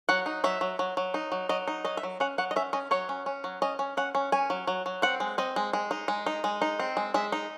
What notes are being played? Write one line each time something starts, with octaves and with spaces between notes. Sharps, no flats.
F#3 F#5
D#4
F#3 E5
F#3
F#3
F#3
D#4
F#3
F#3 D#5
D#4
F#3 D#5
E5
F#3
C#4 F#5
F#3 F#5
D#5
C#4 E5
C#4 D#5
F#3 C#5
C#4
C#4
F#3
C#4 D#5
C#4
C#4 F#5
C#4
C#4 G#5
F#3
F#3
F#3
C4 F#5
G#3
C4 D#5
G#3
G#3
D#4
G#3
D#4
G#3
D#4
C4
G#3
G#3 E5
D#4